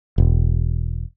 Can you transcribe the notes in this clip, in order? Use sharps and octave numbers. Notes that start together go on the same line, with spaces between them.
E1